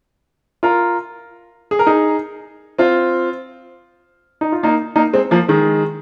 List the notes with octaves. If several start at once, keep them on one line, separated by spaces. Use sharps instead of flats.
F4 A#4
G#4
A#4
D#4 G#4
C4 F4
D#4
F4
A#3 D#4
A#3 D#4
G#3 C4
F3 A#3
D#3 G#3